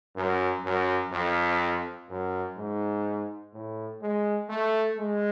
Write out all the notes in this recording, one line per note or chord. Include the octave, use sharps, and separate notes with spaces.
F#2
F#2
F2
F#2
G#2
A2
G#3
A3
G#3